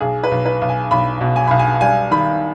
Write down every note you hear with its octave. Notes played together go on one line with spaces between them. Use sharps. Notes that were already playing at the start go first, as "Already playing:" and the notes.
B1 G#4
B4
B1
B4
B1
G#5
B1 B5
B2
G#5
B1 B5
G#5
G3 G#5
D#3 B5